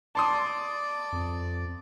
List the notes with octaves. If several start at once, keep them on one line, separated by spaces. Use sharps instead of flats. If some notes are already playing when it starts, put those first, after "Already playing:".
D5 A5 C6 D#6
F2